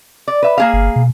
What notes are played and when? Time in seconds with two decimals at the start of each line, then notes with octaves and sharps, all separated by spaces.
0.28 D5
0.42 B4 E5
0.58 A#3 G#4 F5
0.73 G1
0.96 B2